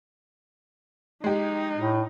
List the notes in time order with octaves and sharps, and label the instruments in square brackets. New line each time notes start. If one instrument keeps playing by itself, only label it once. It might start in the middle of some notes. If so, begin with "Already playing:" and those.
[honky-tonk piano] G#3 G4 [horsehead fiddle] D#4
[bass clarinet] A2